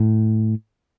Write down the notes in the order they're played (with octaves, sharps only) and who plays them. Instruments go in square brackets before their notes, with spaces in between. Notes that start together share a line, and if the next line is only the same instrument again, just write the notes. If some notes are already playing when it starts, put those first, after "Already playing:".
Already playing: [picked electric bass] A2